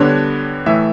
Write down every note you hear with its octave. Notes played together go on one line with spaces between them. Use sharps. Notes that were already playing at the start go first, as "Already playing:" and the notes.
Already playing: D3 G3 B3 D4 C#5
A2 E3 A3 E5